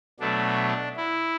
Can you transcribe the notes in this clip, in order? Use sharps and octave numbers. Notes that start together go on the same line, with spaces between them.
B2 F#3 A3 D4
E4